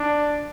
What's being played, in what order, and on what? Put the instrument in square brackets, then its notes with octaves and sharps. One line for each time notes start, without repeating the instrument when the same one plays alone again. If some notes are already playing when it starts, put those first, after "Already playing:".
Already playing: [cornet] D4